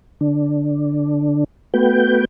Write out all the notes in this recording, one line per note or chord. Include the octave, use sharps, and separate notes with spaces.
D3 D4
A3 B3 F#4 B4 G5 G6